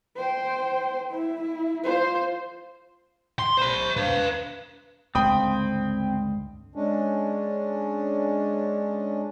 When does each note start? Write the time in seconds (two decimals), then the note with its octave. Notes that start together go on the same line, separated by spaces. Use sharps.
0.16 C5 G5
1.10 E4
1.84 F4 C5
3.39 C6
3.57 C5 B5
3.97 B4 F5
5.15 C#2 G2 D3 C4 G5 B5 D#6
6.75 G#3 C#4 D4